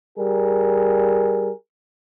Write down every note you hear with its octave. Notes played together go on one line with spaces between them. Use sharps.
G3 G#4 A#4